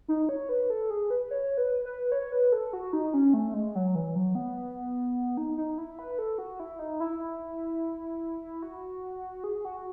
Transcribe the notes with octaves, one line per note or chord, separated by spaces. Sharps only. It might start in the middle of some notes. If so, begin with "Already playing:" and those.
D#4
C#5
B4
A4
G#4
B4
C#5
B4
B4
C#5
B4
A4
F#4
D#4
C#4
A3
G#3
F#3
E3
F#3
B3
D#4
D#4
E4
B4
A4
F#4
E4
D#4
E4
F#4
G#4
F#4